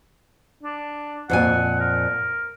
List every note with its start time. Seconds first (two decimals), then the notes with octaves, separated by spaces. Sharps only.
0.63 D4
1.30 F2 A#2 F#5 G#5
1.80 A#4